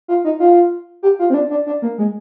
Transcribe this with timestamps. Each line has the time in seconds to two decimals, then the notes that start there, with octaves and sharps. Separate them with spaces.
0.08 F4
0.24 D#4
0.40 F4
1.03 G4
1.19 F4
1.30 C4
1.34 D4
1.50 D4
1.66 D4
1.82 A#3
1.98 G#3